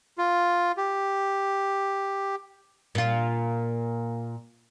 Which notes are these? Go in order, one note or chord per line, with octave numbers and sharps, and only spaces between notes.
F4
G4
A#2 F4